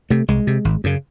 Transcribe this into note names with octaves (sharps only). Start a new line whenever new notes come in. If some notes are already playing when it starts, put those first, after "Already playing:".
C3 A3
C2 G#3
C3
G#1
F#2 C#3